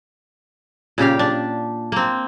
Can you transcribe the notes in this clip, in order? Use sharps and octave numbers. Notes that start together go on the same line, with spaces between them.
A#2 C#3 G4 F5
D4
A#3 C4